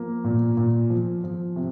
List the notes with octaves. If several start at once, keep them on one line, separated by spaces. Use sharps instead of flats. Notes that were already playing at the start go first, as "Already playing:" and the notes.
Already playing: F3 A#3
A#2
A#2
F3
F3
C3